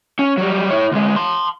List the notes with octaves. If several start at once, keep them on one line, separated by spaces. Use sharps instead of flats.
C#4
F#3 G3
E4 C#5
D2 G#3
A5 C6